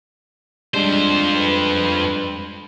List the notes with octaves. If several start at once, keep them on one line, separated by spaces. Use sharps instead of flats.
F2 G3 G#3 D4 C5
B4